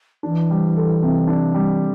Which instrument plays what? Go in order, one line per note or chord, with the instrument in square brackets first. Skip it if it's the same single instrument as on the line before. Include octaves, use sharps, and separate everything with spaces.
[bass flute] E3 [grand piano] D4
[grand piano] G3
A4
C3
D4
G3